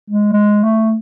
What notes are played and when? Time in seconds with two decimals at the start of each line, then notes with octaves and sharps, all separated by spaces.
0.10 G#3
0.33 G#3
0.64 A3